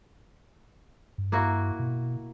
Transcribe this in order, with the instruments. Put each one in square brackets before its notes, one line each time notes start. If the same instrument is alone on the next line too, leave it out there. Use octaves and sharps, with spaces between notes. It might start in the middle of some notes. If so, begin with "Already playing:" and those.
[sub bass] G2
[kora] A#3 E4 F#4
[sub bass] B2